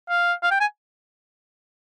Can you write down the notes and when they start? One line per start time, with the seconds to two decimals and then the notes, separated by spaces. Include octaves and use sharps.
0.09 F5
0.43 F5
0.51 G5
0.60 G#5